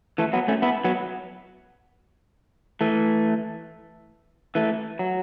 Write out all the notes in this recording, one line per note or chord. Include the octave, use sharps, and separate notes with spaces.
E3 A3
F#3 B3
A3 C#4
B3 E4
F#3 B3
E3 A3
E3 A3
F#3